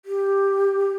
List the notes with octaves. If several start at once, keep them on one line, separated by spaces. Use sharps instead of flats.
G4